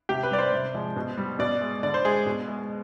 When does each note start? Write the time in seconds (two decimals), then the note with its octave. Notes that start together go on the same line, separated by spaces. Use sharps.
0.09 C3 G4
0.23 B4
0.31 G3 D5
0.38 C5
0.52 C3
0.74 F3 G#3
0.96 B2
1.17 G3
1.39 B2 D5
1.61 G#3
1.83 D3 D5
1.94 C5
2.04 G#3 G#4
2.26 B2
2.48 G#3